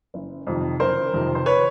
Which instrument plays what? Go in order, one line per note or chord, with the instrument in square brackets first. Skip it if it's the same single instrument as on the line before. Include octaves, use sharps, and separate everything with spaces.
[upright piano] F#1
F2 C3 D#3
F#1 A#4 C5
F2 C3 D#3
C5
B4 C#5